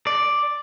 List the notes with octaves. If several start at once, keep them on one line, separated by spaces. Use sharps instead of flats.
D5